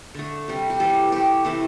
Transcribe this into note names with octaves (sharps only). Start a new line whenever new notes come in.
D3 A3
C3 G3
G4
C3 E3 G3 A4
C3 A3 G4
C3 E3 A3 E4